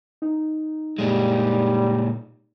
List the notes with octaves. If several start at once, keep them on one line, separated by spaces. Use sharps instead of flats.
D#4
A#2 G3 G#3